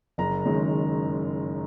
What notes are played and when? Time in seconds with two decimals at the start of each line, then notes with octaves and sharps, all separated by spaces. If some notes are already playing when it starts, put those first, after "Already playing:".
0.18 F#1 A#5
0.45 F#2 D#3 G#3